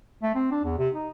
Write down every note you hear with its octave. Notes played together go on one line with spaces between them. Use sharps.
A3
C4
D4
E2
C3
D#4